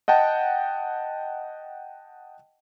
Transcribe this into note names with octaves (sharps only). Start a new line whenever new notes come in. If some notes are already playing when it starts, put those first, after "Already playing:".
D#5 F#5 G5 A5